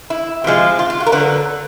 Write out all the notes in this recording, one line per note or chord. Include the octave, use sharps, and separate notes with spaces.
E4
C3 F3 G#3
F4
F4
F#4
A#4
D3 F#3 B4